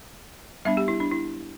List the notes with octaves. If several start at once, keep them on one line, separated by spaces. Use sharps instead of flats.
G3 B3 D4 E5
G4
E4
D4
E4